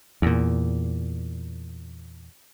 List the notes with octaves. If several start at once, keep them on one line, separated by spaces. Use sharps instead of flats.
E2 A#2